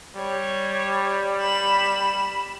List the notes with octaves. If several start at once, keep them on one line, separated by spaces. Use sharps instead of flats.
G3 C#5
B5 E7